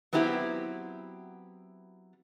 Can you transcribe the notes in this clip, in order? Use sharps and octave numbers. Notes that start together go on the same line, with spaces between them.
F#3 B3 C4 E4 G4 E5